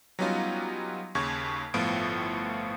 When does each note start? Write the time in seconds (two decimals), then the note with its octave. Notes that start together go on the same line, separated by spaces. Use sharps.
0.19 F#3 G3 B3 C#4 D#4 F4
1.15 D#2 C#3 C#6 G#6
1.74 G1 A2 F3 B3 F4 D7